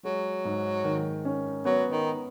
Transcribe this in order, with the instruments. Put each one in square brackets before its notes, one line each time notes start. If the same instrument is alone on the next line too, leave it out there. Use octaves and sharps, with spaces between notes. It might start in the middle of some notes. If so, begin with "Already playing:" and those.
[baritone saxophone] F#3 [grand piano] G#3
[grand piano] G#2
D#3
C#4
[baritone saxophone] F#3 [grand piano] B3
[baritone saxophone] D#3